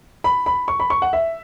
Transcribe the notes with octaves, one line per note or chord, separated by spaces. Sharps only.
B5
B5
C#6
B5
C#6
F#5
E5